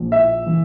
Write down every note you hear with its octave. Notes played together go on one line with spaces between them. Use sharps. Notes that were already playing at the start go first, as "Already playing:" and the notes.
Already playing: A#1 A#2 F3
E5
E3